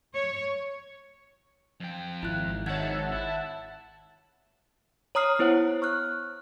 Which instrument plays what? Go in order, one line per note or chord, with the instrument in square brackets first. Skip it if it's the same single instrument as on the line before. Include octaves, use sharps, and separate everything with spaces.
[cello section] C#5
[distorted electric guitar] F2 G5
[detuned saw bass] G#1 [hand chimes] E4 F4 F#6
[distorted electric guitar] D#3 [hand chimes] C#5 G#6 [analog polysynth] E5 F#5 A5
[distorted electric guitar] E4
[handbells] C#5 A#5 D#6 F6 C7
B3 E4 C5 C#5 F#5
C#6 F6 F#6